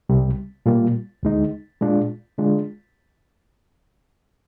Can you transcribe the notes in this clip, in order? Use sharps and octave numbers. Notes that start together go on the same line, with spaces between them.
C2 C3 G3
A#2 G3 A#3 F4
D2 D3 G#3 D#4
A#2 G#3 D4 F4
D3 G#3 D4 F4